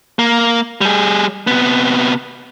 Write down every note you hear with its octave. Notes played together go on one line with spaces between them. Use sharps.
A#3
G3 G#4
C3 B3